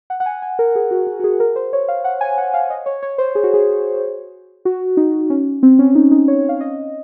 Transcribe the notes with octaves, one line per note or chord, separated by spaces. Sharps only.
F#5
F#5
G#5
G#5
A#4
G#4
F#4
F#4
F#4
G#4
A#4
C5
C#5
F5
F#5
G#5
F#5
F5
D#5
C#5
C#5
C5
G#4
F#4
G#4
F#4
D#4
C#4
C4
C#4
D#4
D#4
C#5
F5
D#5